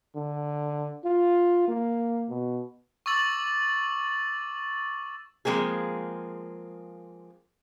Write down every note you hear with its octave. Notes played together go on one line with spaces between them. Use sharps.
D3
F4
A#3
B2
C#6 D6 E6 A6 F#7
F3 G#3 A#3 C4 G#4